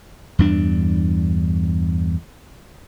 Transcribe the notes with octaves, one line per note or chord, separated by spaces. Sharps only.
E2 G2 D4